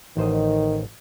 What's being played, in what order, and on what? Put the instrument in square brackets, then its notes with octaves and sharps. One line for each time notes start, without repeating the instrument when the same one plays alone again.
[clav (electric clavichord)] A1 C5 D#5 [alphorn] D#3